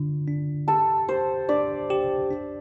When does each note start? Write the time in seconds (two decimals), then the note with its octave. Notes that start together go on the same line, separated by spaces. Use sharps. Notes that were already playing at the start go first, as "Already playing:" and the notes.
Already playing: D3 D4 F4
0.27 D4
0.68 G4 A4
1.08 G4 C5
1.49 D4 D5
1.90 G4
2.31 D4